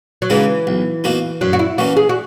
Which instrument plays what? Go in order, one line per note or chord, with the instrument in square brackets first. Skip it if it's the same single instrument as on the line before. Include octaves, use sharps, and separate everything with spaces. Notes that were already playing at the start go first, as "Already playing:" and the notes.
[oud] F#3
[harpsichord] C#3 G#3 D#4 F#4 [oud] E3
[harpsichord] B1
B2 A#3 D#4 F#4
[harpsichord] F#2 [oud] F#3
[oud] F#4
E4
[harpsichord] E3 A#3 C#4 [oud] F#4
[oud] G#4
F#4